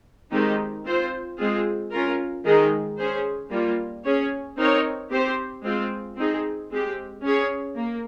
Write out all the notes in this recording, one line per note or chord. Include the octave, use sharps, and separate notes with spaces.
D#3 G#3 C4 D#4 G4
C4 F4 C5
G#3 C4 F4 G#4
C#4 F4 A#4
D#3 G#3 D#4 G#4
C#4 G#4 C5
G3 A#3 F4
C#4 G#4 C#5
C4 D#4 A#4 C#5
C4 G4 C5
G#3 C4 F4
C4 D#4 G#4
G#3 C4 G4
C#4 G#4 C#5
A#3